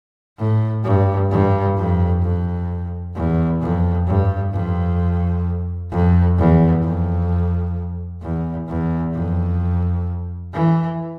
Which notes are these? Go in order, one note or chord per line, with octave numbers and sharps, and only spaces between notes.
A2
G2
G2
F2
F2
E2
F2
G2
F2
F2
E2
F2
E2
E2
F2
E3